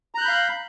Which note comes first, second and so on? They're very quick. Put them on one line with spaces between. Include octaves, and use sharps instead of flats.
A#5 F#6 G6 B5 F5